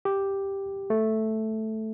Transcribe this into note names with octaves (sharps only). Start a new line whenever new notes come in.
G4
A3